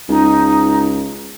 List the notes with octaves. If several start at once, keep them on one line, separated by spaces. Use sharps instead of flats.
C#2 D#4